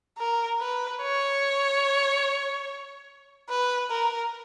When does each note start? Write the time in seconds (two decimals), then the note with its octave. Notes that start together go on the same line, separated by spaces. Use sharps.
0.19 A#4
0.60 B4
1.02 C#5
3.49 B4
3.90 A#4